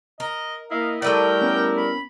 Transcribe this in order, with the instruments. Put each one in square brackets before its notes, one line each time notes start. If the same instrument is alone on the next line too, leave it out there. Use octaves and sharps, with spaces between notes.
[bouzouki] A#4 [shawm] D#5
[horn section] A#3 E4 D#5 [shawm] F5
[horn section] G3 E4 A#4 [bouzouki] A3 B4 D5 [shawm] G5
[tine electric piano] B3 C#4
[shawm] B5